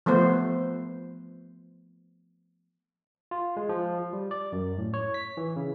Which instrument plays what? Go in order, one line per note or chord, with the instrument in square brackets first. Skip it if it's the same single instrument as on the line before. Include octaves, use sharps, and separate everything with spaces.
[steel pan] F3 A3 B3 C5
[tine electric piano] F4
G#3
F3
G3
D5
F#2
A2
C#5
B6
E3
C#3